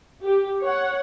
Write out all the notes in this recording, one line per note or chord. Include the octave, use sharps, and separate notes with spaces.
G4
C#5 F#5